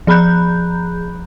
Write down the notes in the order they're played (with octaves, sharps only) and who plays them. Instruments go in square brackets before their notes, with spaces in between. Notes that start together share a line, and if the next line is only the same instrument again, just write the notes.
[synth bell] F3 G#4 A#5 B5 F#6 G6